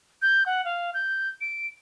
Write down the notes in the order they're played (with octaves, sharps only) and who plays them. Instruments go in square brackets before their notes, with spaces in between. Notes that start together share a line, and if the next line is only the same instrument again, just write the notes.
[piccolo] G6
F#5
F5
G6
D7